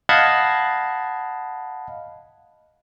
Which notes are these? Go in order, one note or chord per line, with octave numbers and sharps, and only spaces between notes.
D#5 F5 F#5 A5 B5 G#6